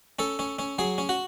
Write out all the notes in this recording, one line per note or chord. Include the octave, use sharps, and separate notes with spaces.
C#4 A4
C#4
C#4
F#3 G#4
C#4
F#4